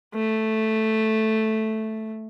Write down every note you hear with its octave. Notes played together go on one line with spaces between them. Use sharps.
A3